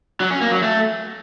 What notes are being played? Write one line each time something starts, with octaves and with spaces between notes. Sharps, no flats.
F#3
C#4
A#3
F#3
A3